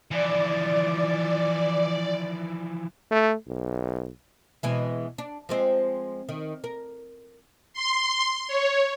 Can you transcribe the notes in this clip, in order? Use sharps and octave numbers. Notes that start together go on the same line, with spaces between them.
E3 F3 D5
A3
B1
B2 E3 G#3
D4
F3 G#3 C4
D#3
A#4
C6
C#5